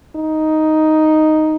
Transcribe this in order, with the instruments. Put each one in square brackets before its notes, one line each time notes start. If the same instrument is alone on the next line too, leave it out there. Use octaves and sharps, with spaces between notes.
[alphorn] D#4